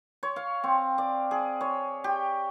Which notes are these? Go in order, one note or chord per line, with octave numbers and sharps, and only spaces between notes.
C#5
F5
C4
D5
G#4
C#5
G4